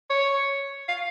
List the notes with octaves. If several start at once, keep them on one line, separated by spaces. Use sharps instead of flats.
C#5
F5